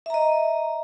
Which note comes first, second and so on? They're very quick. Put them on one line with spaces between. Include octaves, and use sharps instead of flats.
E5 A#5 D#5